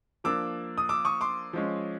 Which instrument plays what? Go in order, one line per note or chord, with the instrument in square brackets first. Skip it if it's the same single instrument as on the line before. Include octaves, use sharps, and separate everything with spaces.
[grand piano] F3 A#3 D4 D6 E6
D#6
D6 E6
C#6 D#6
C6 D6
F3 G#3 C#4